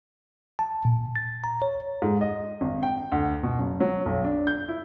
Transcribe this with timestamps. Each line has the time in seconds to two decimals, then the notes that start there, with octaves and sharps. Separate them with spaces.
0.59 A5
0.85 A#2
1.16 A6
1.44 A#5
1.62 C#5
2.02 G#2
2.21 D#5
2.61 G#1
2.83 G5
3.12 D2
3.43 B2
3.58 F#1
3.80 F#3
4.06 B1
4.25 D4
4.47 G6
4.68 E4